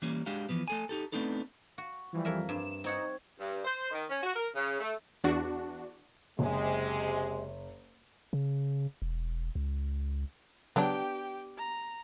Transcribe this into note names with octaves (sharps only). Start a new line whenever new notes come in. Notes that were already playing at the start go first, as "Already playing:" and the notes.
E3 G3 A#3 C#4
G#3 D4 F#4 G4 F5
E3 F3 B3
A3 A4 G#5
D#4 G4 A4
A3 B3 C4 D4 D#4 A4
F#4
E3 F3 G3
F2 A#4 E5
G2 E7
C4 D#4 C#5 F#5
G2
C5
D#3
C#4
F#4
A#4
C#3
A3
E2 D4 F#4
F#1 C3 G#3
C#3
E1
C#2
C#3 F#3 B3 D4 G4 G5
A#5